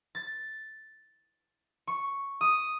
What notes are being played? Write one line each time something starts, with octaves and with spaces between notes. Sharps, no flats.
A6
C#6
D#6